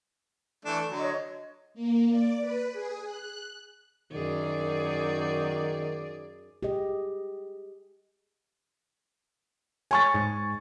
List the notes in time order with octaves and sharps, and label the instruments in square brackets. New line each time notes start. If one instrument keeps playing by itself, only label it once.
[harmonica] E3 A3 D4
D3 F#3
[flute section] C#5 D#5 C6
[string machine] A#3
D5
B4
G#4
F#6
[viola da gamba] F#2 G#4 D5 [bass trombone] D#3
[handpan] G4 G#4 D#5
[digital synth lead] C#5 [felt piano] G#5 C#6 A6
[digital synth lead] G#2